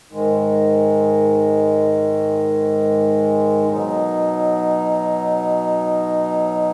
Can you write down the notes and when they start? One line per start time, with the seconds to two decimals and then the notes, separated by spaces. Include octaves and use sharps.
0.11 G#2 D#3 G#3
3.71 B2 F#3 D#4